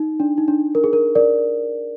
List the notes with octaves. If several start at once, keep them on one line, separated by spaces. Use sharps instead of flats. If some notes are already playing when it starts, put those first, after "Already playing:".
Already playing: D#4
D4
D#4
D4
A#4
G#4
A#4
A#4 D5